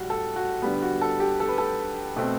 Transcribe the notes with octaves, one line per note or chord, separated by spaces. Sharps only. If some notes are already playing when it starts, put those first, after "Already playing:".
Already playing: A2 G3 F#4
A4
F#4
D3 G3 B3
F#4
A4
G4
A4
B4
A4
B2 A3 C4